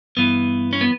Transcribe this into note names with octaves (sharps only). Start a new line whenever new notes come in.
G2 E3 B3
C#4
B3